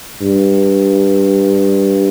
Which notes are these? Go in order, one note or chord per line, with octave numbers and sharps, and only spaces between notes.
G2